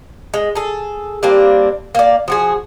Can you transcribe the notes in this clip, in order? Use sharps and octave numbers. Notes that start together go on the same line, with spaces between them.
G#3
G#4 A4
G3 A#3 C4 D4
A#3 D5
F3 F#4 G#4